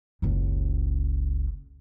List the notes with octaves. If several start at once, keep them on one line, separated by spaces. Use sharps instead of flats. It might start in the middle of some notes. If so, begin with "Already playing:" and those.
F#1 C#2